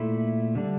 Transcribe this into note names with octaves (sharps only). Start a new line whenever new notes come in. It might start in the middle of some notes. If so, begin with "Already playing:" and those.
Already playing: A#2 A3 E4
D3 G3 D4